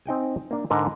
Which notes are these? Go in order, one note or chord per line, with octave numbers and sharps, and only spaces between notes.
C4 D#4 G5 G#5
A#3 D4
G#2 D3 A#4 D#5